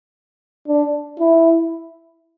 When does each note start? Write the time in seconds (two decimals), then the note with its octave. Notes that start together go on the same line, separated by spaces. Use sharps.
0.68 D4
1.19 E4